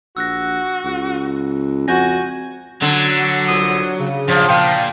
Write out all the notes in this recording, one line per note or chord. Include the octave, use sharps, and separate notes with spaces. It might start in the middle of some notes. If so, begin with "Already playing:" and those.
A#1 F#4 E6 F#6 A#6
C#2
F2 F#4 G#5 G6 A#6
D3 F#3
C2 F4 D#6
C#3
G2 F3 F#3
A#2 F5 G5